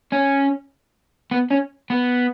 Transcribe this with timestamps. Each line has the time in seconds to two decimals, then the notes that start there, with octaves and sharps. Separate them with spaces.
0.13 C#4
1.31 B3
1.51 C#4
1.90 B3